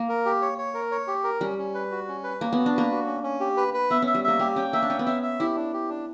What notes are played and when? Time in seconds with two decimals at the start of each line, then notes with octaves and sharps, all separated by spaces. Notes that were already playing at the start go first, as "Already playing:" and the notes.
Already playing: A#3
0.09 A#4
0.25 G4
0.42 C#5
0.58 C#5
0.74 A#4
0.91 C#5
1.07 G4
1.24 A#4
1.41 G3 C#4
1.58 C#4
1.75 B4
1.91 F#4
2.08 C#4
2.23 B4
2.40 A#3 C#4
2.53 B3
2.58 F#4
2.66 D4
2.74 A#3 B4
2.91 F#4
3.06 C#4
3.23 C#4
3.40 G4
3.57 B4
3.74 B4
3.91 B3 E5
4.02 C#4 E5
4.15 G3
4.24 A#3 E5
4.39 A#3 G4
4.56 C#4 G5
4.73 A#3 E5
4.82 D4
4.89 C#4 G5
4.99 B3
5.06 C#4 E5
5.23 E5
5.39 E4 G4
5.56 D4
5.73 G4
5.89 D4